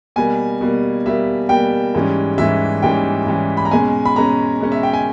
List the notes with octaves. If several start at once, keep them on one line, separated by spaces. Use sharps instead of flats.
B2 G3 A#3 G#5
B2 G3 A#3
B2 G3 A#3 E5
B2 G3 A#3 G5
G#2 E3 G3 C#4
G#2 E3 G3 C#4 E5
G#2 E3 G3 C#4 G5
G#2 E3 G3 C#4
B5
A#5
B2 G#3 C#4 G#5
B5
B2 G#3 C#4 A#5
B2 G#3 C#4
E5
G5
G#5